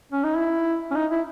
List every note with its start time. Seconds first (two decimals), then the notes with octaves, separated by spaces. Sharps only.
0.12 C#4
0.24 D#4
0.37 E4
0.91 C#4
0.95 D#4
1.11 E4